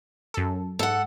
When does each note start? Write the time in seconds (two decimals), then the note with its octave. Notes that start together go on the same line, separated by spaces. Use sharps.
0.34 F#2 A4
0.79 G#2 A4 F#5